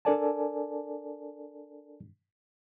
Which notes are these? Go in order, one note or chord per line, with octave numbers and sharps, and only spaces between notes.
D4 A4 A#4 D5 G#5 A5